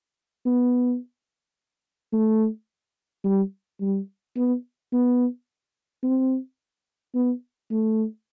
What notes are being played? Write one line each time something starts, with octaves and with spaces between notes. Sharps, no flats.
B3
A3
G3
G3
B3
B3
C4
B3
A3